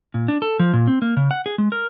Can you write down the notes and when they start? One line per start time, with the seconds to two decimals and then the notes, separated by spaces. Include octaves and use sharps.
0.14 A#2
0.28 D4
0.42 A4
0.59 F3
0.73 A#2
0.88 C4
1.02 A#3
1.17 C#3
1.31 F#5
1.46 G#4
1.58 G#3
1.72 A#4